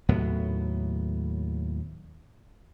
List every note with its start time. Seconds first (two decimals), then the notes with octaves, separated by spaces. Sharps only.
0.09 D#2 A2 F#3 B3